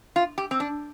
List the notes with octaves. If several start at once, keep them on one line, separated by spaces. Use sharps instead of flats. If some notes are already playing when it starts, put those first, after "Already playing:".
F4
G4
C4
D4